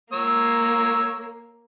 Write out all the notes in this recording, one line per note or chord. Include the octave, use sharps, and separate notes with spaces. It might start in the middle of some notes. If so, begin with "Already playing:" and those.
A#3 C#5 E6